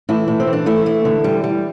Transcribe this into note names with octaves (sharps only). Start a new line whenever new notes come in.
A2 E3 E4
A2
C4
E3
D4
E3 A3 E4
A3
D3
G3
G3